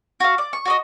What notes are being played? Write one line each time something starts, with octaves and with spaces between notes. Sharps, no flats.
F#4 F5
D5
C#6
F#4 D5 D#5